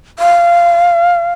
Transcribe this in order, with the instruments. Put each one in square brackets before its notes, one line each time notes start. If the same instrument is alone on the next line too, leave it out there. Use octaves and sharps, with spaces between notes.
[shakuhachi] F5